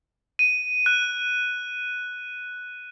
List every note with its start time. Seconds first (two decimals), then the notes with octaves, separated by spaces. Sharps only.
0.39 D#7
0.86 F#6